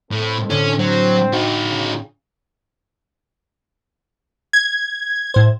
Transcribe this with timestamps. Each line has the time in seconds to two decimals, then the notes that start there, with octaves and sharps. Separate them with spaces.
0.11 A2 C4 A4
0.50 A2 D3 C#4
0.79 F#3 C4 C5
1.33 D#4 F#4 G5
1.68 C#3
4.53 G#6
5.34 A2 C5